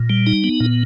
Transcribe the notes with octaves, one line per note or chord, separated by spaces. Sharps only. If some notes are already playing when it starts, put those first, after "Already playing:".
Already playing: A#2
G3
D#4
B3
A#2